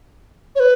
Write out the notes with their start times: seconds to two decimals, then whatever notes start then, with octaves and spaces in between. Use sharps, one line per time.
0.56 C#5
0.60 B4